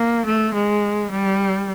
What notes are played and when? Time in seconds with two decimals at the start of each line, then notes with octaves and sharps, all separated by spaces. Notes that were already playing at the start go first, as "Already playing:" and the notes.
Already playing: A#3
0.26 A3
0.54 G#3
1.11 G3